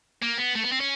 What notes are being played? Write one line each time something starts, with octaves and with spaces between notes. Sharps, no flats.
A#3
B3
A3
B3
C4
C#4